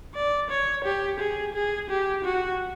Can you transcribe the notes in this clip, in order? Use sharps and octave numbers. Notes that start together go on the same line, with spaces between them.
D5
C#5
G4
G#4
G#4
G4
F#4